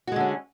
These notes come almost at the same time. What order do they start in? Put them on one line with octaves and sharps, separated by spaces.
F#4 G#3 D3 C#4